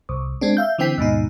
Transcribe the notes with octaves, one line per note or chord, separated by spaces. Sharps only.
C2
G#3 C4 D4
E5 F5 G6
D3 E3 C4 G5 B6
D#2 G#2 B2 D#4